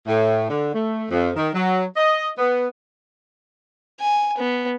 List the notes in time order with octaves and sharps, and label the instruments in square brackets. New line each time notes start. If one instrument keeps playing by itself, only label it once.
[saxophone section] A2
D3
A3
F2
D#3
F#3
D#5
B3
[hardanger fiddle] G#5
B3